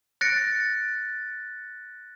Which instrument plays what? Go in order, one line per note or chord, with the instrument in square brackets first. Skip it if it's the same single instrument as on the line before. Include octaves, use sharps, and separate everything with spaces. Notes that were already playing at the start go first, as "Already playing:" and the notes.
[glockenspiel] F#6 A6 A#6 C#7 D7